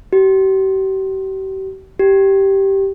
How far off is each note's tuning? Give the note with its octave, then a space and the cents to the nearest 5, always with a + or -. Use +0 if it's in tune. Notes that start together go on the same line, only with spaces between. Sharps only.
G4 -40
G4 -10